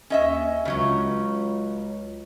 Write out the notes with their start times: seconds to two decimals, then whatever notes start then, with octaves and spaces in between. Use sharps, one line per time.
0.10 D#2 C#4 D#5 E5
0.65 C#2 C#3 F#3 C#4